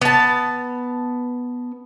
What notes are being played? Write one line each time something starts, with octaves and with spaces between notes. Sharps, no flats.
B3 A5